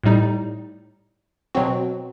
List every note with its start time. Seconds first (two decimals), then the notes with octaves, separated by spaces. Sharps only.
0.04 A2 G3 D#4
1.55 B2 F#3 C4 F#4